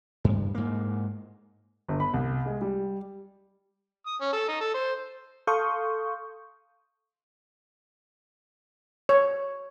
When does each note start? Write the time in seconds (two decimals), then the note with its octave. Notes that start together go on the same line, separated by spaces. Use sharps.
0.24 G2
0.55 G#2 A#3
1.89 G1
2.00 B5
2.14 C2
2.46 G#3
2.61 G3
4.06 D#6
4.21 C#4
4.33 A4
4.48 D#4
4.61 A4
4.74 C5
5.47 A4 F5 C6 C#6 D#6 G6
9.09 C#5